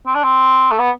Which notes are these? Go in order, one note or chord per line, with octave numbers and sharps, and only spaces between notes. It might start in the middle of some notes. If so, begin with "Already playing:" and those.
C4
D4
C4
A3
B3